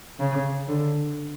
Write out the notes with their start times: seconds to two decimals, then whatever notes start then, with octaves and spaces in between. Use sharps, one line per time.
0.20 C#3
0.68 D3